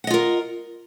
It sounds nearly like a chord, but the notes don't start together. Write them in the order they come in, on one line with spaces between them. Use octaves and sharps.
F#5 D#5 F4 A#4